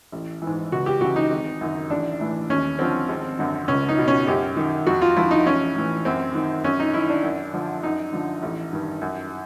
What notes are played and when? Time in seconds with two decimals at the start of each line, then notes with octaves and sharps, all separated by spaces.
0.12 A1
0.42 E3
0.47 G#2
0.72 C#2 F#4
0.86 G4
1.01 C#3 E3 F#4
1.16 D#4
1.31 G#1
1.61 F#2 D#3
1.90 A1 D4
2.20 A2 E3
2.50 D#2 C#4
2.79 D3 F3 C4
3.09 G#1
3.39 F#2 D3
3.68 C#2 C#4
3.89 D#4
3.98 B2
4.08 C#4
4.27 F#2 G4
4.57 D#3
4.87 F2 F#4
5.02 F4
5.17 D3 F3 E4
5.31 D#4
5.46 A1 C#4
5.76 A2 E3
6.05 F#2 C4
6.35 D#3
6.64 F#2 C#4
6.80 D#4
6.94 D#3 E4
7.10 D4
7.23 F#2
7.54 D3 F3
7.83 F#2 D#4
8.13 D3 F3
8.43 A1
8.73 G2 D#3
9.01 F#2